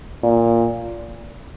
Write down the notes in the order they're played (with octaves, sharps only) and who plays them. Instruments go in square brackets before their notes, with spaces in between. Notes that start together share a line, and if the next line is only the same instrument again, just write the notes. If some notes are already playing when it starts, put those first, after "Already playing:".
[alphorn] A#2